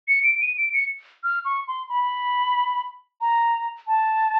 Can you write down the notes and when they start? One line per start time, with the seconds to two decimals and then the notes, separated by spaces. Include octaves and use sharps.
0.08 C#7
0.23 D7
0.41 D#7
0.58 D7
0.74 C#7
1.24 F6
1.45 C#6
1.68 C6
1.89 B5
3.21 A#5
3.87 A5